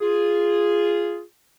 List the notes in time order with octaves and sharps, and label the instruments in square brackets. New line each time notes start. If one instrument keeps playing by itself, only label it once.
[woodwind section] F4 G#4